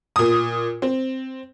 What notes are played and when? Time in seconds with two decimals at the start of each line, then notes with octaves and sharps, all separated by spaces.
0.16 A#2 D#6
0.82 C4